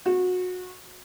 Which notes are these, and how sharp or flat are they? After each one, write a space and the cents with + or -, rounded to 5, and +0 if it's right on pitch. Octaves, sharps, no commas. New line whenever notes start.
F#4 -25